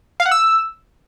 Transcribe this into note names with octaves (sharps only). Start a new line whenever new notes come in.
F5
F#5
E6